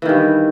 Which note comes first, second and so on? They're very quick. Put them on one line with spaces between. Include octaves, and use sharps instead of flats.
E3 D#3 G2